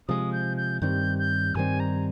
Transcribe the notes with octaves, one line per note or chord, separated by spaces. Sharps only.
C3 F3 G#3 D#6
G6
G6
G2 D#3 G3 C4 G6
G6
G2 D#3 G3 C4 G#5
A#5